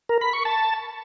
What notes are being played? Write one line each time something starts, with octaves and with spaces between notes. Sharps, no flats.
A#4
B5
C#6
A5